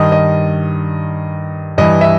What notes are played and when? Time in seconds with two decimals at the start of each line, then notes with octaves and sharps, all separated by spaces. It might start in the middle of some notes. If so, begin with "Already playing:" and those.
Already playing: G2 D#3 D#5
0.12 D#5
1.78 G2 E3 D#5
2.01 E5